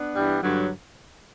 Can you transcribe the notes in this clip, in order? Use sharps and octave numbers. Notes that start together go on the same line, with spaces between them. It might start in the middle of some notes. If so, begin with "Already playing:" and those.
Already playing: B3 D4
G2 E3 G3
G2 D3 F#3